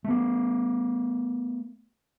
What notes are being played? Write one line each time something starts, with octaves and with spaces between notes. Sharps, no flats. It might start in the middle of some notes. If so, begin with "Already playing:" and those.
A3 B3